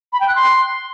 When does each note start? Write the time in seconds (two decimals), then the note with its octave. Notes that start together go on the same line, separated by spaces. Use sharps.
0.13 B5
0.20 G5
0.28 F#6
0.36 C6